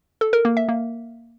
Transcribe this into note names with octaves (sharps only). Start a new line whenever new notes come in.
A4
A#4
A#3
E5
A#3